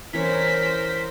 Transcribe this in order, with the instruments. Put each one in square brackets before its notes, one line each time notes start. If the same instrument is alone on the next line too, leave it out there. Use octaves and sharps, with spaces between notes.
[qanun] E3 C#4 [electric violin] A#4 C5 [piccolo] B6